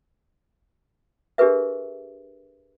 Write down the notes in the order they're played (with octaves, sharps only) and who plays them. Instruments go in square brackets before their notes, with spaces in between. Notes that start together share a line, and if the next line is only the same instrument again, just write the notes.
[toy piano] D4 G4 G#4 A#4 B4 E5